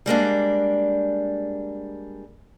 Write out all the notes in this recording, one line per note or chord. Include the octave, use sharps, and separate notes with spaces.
G3 G#3 A#3 D4